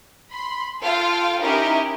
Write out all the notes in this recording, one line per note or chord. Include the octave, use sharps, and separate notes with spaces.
B5 C6
F4 A4 F5 G5
C#4 D#4 E4 G4 A#4